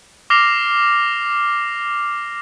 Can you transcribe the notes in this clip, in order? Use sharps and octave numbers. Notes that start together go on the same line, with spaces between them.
D6 F6 A#6 C7 F7